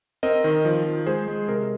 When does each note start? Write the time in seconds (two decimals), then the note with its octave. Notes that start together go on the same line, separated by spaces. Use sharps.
0.23 C4 A#4 D#5
0.44 D#3
0.65 F3
0.85 F3
1.06 G#3 G#4 C5
1.28 G#3
1.48 C3 A#4